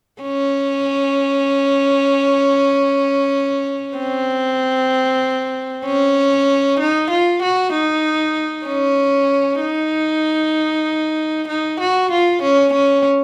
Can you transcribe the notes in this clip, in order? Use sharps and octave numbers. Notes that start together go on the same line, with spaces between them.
C#4
C4
C#4
D#4
F4
F#4
D#4
C#4
D#4
D#4
F#4
F4
C#4
C#4